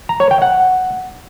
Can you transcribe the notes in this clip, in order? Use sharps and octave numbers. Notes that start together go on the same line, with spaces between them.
A#5
C#5
G5
F#5